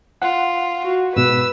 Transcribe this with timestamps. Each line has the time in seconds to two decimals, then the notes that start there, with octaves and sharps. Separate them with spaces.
0.22 F4 F#5
0.82 F#4
1.16 G#2 B2 B4 E6